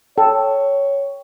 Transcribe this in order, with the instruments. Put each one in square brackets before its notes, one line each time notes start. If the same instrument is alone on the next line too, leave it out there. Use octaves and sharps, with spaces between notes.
[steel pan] A4 [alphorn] C#5 [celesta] G5